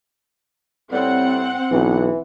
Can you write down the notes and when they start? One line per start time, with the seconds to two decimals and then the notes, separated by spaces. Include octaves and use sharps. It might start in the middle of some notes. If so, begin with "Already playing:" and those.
0.92 A2 G3 C4 F#5
1.71 B1 E3